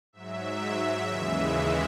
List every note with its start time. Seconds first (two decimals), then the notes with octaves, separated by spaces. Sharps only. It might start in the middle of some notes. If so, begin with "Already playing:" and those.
0.13 G#2 F#3 E5
1.05 D#2 C#3 E3 G#3